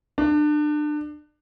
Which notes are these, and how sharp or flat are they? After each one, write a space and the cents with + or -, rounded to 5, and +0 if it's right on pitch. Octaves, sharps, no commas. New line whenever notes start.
D4 +30